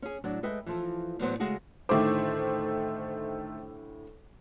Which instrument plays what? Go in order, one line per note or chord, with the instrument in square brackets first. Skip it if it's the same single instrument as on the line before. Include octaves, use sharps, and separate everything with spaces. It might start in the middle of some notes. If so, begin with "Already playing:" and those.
[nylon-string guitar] C#4 G#4
A2 F#3 D4 D5
G#3 A4 B4 D#5 E5 G5
E3 F3 A4
E2 A2 E3 F#3 B3 C5
C#3 G#3 A3 F#4 G#4
[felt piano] D2 A2 D6 [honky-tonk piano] D#3 A3 C5